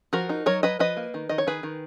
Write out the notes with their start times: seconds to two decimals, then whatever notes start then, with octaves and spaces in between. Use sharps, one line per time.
0.13 F3 F#4 A#4
0.29 D#4
0.46 F#3 A#4 C#5
0.63 F#3 B4 D#5
0.79 F3 B4 D#5
0.97 A#3
1.14 D#3
1.29 D#3 D#5
1.38 C#5
1.47 D#3 G#4 B4
1.63 D#3